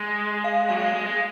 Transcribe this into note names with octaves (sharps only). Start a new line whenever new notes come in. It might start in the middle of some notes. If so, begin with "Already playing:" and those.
Already playing: G#3
F5
F#3 F5
G#3
G#3
G#3